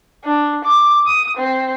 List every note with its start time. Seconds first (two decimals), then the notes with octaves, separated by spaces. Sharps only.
0.24 D4
0.65 D6
1.06 D#6
1.37 C4